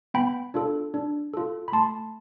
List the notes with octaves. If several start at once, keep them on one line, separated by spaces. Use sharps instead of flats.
B3 G5 B5
D4 F4 A4
D4
F4 A4
B5
A3 A5 C6